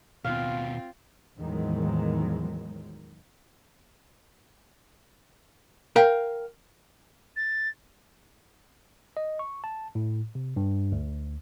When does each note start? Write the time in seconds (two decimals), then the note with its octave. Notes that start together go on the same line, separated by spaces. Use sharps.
0.25 D#2 B2 C4 F4 F5
1.39 E2 A2 D#3 F3 F#3 G#3
5.96 A#4 F5 G5
7.36 A6
9.17 D#5
9.39 C#6
9.64 A5
9.95 A2
10.35 C3
10.56 G2
10.92 D2